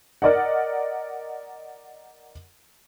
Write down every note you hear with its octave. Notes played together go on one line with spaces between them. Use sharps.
A#4 D5 D#5 F#5